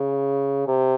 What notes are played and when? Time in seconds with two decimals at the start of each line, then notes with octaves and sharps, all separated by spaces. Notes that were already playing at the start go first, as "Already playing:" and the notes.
Already playing: C#3
0.67 C3